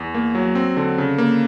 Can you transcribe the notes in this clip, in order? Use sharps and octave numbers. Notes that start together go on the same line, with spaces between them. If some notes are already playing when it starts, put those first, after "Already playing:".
Already playing: E2
A#3
F#3
C4
D3
C#3
A#3